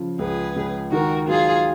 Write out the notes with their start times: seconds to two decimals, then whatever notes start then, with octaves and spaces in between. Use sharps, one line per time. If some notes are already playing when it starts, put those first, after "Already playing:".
Already playing: C#3 F3
0.19 C#2 G#4 B4
0.56 C#2
0.92 D#3 F#4 A#4
1.28 F#3 F4 G#4